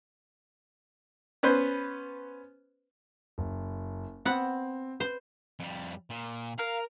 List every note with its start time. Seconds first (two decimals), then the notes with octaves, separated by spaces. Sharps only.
1.43 B3 C#4 B4 C5
3.38 F#1
4.25 B3 C4 F#5
5.00 B4 C5
5.59 F2 G3
6.10 A#2
6.59 A#4 F5